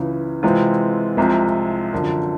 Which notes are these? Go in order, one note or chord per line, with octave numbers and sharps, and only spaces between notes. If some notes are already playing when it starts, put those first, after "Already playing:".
Already playing: C#2 C#3 E3
C3 E3 G#3 C4 F4
C2 C3 F3 G#3
F#2 D3 F3